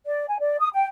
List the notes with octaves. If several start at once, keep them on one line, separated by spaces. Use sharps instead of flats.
D5
G#5
D5
D#6
G5